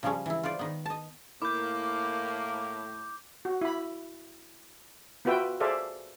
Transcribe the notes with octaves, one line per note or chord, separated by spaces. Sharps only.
C#3 F3 G3 G#3 C#4
E3 E4
F4 B4 C5 D5
D#3 B3
D#5 A5
A2 A#3 E4 D6 G6
F#4
E4 B5
B3 F4 F#4 B4 E5 G5
G#4 A4 C5 D5 E5 F5